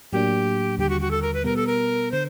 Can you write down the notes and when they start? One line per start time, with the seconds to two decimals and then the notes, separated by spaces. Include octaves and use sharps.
0.12 A2 F#3 A#3 D4 G4
0.78 D#2 D3 G3 G4
0.89 F#4
1.01 F#4
1.11 A4
1.22 A#4
1.34 B4
1.44 B2 G3 B3 A#4
1.56 A4
1.67 A#4
2.12 D3 C5